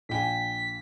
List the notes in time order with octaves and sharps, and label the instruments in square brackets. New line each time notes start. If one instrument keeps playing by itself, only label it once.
[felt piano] A#1 G5 G#5 [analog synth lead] B6